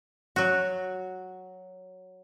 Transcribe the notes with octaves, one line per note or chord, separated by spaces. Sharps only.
F#3 F#4